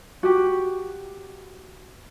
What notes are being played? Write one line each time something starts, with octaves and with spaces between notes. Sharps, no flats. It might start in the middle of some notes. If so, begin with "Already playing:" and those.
F#4 G4